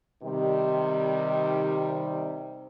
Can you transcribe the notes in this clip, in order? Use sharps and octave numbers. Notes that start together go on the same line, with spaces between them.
C3 D#3 G3